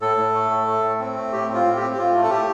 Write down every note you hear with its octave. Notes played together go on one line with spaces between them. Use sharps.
A2 A4
A2
A3
A2
A3
A2
C4
A3
A2 G4
C4
F4
A2
G4
C4
G4
A2 F4
A3
A4
A2 G4